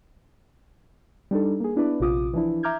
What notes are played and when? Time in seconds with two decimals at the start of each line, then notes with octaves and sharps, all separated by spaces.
1.31 G3 D4 D#4 A4
1.60 A#3 G#4
1.76 B3 D4 E4 B4 D5
2.00 A#1 C3 F4 D6 D#6
2.33 E3 F3 D4 E4
2.63 E5 A#5 D6 F6 G6 G#6